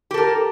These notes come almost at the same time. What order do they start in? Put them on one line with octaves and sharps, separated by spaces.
G4 A4 A#4